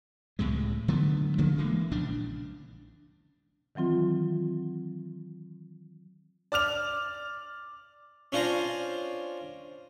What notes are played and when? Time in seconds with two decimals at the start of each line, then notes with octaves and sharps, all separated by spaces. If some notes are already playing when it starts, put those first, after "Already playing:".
0.39 C#2 A2 C3 G#3
0.88 D3 F#3 A3 B3
1.38 C#3 F3 A#3 B3
1.58 E3 G#3 A#3
1.92 A#1 C#3 D4
3.75 D#3 E3 F#3 C4 F4
6.52 D5 D6 F6 F7
8.32 C#4 D4 F4 C5 A#5